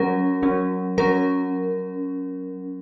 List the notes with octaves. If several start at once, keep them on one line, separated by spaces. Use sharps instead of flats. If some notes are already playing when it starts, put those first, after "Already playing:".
Already playing: F#3 C#4 A#4
F#3 C#4
F#3 C#4 A#4